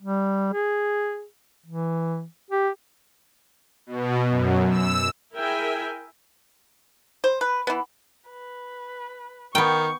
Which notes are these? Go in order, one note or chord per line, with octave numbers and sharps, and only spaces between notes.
G3
G#4
E3
G4
B2
F#2
E6
E4 G#4 A#4 E5 G5 G#5
C5
B4
E3 B3
B4
D#3 B3 G5 C#6